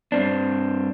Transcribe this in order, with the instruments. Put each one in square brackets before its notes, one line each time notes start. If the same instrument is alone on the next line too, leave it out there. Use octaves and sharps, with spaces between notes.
[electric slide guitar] G2 C4 D4